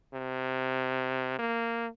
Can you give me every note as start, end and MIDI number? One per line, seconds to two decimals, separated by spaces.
0.13 1.36 48
1.38 1.87 58